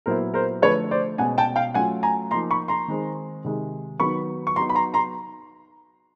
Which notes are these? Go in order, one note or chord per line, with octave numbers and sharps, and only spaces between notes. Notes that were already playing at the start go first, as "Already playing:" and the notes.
A#2 F#3 B3 E4 A#4 C5
A#4 C5
D3 F3 A3 B4 C#5
C5 D5
B2 G#3 C#4 F#5 G#5
G5 A5
F5 G5
F#3 A3 C#4 F4 F#5 G#5
G#5 A#5
F3 A#3 D#4 A#5 C6
B5 C#6
A#5 C6
D#3 G#3 C4
C3 D#3 G#3
D#3 F#3 B3 D#4 B5 C#6
C#6
F#3 B3 D#4 A#5 C6
B5
A#5 C6
A#5 C6